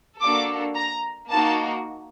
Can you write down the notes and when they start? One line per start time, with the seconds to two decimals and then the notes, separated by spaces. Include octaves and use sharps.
0.21 A#3 D4 F#4 A4 D6
0.75 A#5
1.30 A#3 D#4 F#4 A5